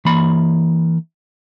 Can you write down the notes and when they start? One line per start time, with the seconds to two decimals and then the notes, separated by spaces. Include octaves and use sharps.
0.05 E3 A#3 B5